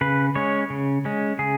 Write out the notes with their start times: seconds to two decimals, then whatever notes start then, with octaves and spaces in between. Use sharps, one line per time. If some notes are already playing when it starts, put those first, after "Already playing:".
0.01 C#3 B4
0.35 G#3 C#4 C#5
0.70 C#3
1.05 G#3 C#4
1.39 C#3 G#4